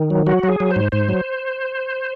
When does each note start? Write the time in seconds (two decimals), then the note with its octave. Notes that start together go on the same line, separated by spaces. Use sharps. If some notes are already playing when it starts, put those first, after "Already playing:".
Already playing: D#3
0.10 F#3
0.27 F#3 F#4
0.43 F#3
0.49 G#4
0.60 F#3
0.71 C5
0.76 G#2
0.92 G#2 C5
1.09 F#3